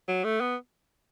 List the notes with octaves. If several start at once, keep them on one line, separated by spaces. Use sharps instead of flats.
F#3
A3
B3